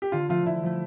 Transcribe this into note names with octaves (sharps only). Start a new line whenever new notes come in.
G4
D3 F4
F3 A3 F4
D3 E4
F3 A3